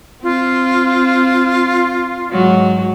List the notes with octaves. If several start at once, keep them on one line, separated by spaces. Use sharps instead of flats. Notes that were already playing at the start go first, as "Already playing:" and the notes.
C4 F4
G#2 F#3